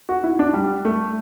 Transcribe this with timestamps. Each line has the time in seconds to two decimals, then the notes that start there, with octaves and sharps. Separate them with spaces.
0.09 F#4
0.24 E4
0.39 D4
0.54 G3
0.85 A3